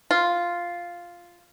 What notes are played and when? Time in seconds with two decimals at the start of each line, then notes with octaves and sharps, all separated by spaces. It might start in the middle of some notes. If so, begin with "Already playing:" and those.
0.11 F4